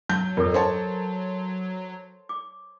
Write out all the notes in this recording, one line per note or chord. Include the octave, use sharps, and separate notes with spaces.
F#3 A5 G6
F2 A4 A#4
C5 C#5 A5
D6